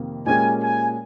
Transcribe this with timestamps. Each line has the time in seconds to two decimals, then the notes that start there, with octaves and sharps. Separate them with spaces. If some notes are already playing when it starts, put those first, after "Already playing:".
Already playing: F2 C3 D#3 A#3
0.26 A#2 G#3 C#4 G4 A#4 G#5
0.62 G#5